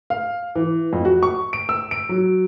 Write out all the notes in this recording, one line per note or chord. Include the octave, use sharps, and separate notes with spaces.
F5
E3
F2
F#4
C#6
D7
E6
D7
F#3